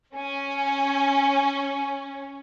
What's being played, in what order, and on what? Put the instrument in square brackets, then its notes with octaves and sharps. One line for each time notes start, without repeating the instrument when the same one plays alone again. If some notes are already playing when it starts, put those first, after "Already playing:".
[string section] C#4 [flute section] G#5